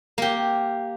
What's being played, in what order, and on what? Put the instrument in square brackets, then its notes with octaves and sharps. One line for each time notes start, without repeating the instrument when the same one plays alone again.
[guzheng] A#3 G4